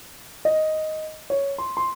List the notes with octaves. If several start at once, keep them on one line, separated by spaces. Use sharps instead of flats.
D#5
C#5
C6
C6